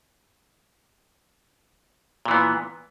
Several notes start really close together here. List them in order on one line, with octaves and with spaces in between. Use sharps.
A#2 E3 B3